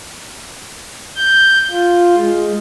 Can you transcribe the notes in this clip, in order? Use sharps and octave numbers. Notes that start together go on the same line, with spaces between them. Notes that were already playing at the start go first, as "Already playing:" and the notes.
G6
F4
G#3